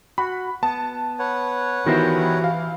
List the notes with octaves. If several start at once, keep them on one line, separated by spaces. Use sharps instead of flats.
F#4 B5
B3 A5
B4 C#5 F#5
D#3 E3 B3 E4 F#4 G4 C5
F5